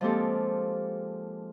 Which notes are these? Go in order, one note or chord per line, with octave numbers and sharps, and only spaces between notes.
F3 G#3 A#3 C4 G4 A4